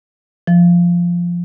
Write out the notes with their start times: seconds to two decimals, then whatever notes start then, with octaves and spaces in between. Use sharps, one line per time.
0.47 F3